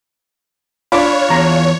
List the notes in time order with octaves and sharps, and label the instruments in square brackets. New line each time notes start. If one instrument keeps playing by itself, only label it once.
[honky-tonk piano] D4 F4 [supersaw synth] C#5 [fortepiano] B5 D6
[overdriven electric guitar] E2 [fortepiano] A#5